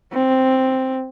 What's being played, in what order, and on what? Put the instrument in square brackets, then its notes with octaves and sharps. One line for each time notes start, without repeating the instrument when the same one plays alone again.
[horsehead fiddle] C4